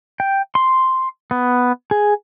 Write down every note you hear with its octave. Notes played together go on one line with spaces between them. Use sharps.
G5
C6
B3
G#4